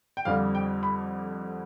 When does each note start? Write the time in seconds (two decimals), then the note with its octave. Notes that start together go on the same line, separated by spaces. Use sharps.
0.17 G5
0.25 F2 D3 G3 F5
0.55 G5
0.83 B5